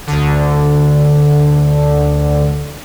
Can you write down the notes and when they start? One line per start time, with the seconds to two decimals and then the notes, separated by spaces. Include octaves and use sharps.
0.07 D2 D3